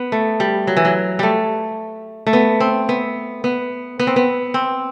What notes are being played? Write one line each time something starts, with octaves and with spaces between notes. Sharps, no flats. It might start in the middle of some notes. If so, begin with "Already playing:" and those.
Already playing: B3
A3
G3
F#3
E3
F#3
G3 A3
A3
B3
C4
B3
B3
B3
C4
B3
C4